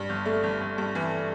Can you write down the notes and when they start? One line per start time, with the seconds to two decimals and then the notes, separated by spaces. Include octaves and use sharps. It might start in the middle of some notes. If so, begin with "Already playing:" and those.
Already playing: G2
0.09 G1
0.26 A3
0.43 G1
0.61 G1
0.78 G2
0.95 E3